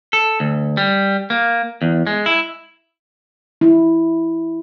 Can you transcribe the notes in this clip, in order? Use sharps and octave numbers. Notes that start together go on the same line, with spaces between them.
A4
D2
G3
A#3
E2
G#3
E4
E4